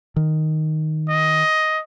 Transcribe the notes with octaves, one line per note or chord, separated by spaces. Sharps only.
D#3
D#5